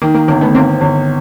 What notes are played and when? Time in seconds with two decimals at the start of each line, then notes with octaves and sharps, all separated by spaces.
0.02 D#3 A#3
0.15 A#3
0.28 G1 A#3
0.41 A3 B3
0.55 G1 A#3 C4
0.81 G1